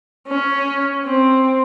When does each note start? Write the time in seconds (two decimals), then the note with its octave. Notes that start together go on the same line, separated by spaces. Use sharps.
0.27 C#4
1.05 C4